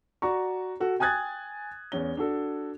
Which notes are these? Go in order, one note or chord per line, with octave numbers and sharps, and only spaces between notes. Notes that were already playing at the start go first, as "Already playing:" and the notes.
F#4 D5 A#5 C#6
F#4 A4
G5 G#5 D#6 F#6 G#6 A6
E2 C#4 G7
D4 F#4 A4